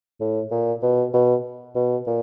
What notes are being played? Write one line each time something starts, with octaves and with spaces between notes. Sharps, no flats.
A2
A#2
B2
B2
B2
A#2